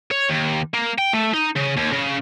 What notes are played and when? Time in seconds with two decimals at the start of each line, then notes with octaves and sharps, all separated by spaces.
0.11 C#5
0.29 D#2
0.74 A#3
0.98 G5
1.13 A3
1.34 D#4
1.56 C#3
1.77 D#2
1.92 C#3